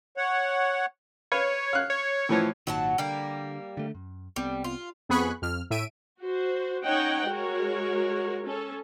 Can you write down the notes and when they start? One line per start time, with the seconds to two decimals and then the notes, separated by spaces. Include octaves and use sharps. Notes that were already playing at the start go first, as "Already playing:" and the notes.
0.17 C#5 F#5
1.32 B4 C#5 F5
1.73 F5 F#6
1.90 C#5
2.29 A2 E3 F3
2.67 G#1 A#2 D#3 F#3 F#5 A5
2.98 D3 G3 A#3
3.77 D3 A3
3.95 F#2
4.36 C2 G3 B3 C4
4.64 F4
5.09 F2 B3 G#4 B5 C#6 F#6
5.42 F2 F6
5.70 A2 E5 D7 D#7
6.21 F#4 C5
6.84 C#4 D#4 C#5 D#5 F#5 G5
7.27 G#3 F#4 A#4 C#5
8.45 C#4 A4